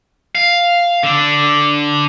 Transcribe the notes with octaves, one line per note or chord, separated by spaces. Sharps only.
F5
D3